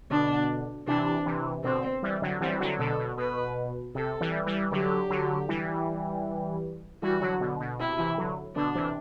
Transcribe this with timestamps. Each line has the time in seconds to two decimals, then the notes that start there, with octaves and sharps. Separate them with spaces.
0.10 B2 D3 D4
0.87 C3 E3 D4
1.25 C3 E3
1.64 B2 D3 C4
2.03 E3 G3
2.22 D3 F#3
2.41 E3 G3 C4
2.60 D3 F#3
2.79 B2 D3 A4
2.98 B2
3.18 B2 B4
3.95 C3 A4
4.21 E3 G3
4.46 E3 G3
4.72 D3 F#3 G4
5.10 D3 F#3
5.48 E3 G3
7.02 E3 G3 F#4
7.21 D3 F#3
7.40 B2 D3
7.60 B2
7.80 C3 E4
7.99 C3 E3
8.18 D3 F#3
8.56 B2 D3 D4
8.75 C3 E3